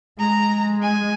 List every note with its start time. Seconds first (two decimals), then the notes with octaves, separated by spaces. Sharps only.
0.19 G#3 A#5
0.82 G#5